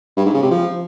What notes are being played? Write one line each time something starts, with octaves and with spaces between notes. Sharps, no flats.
G2
G#2
C#3
C3
F3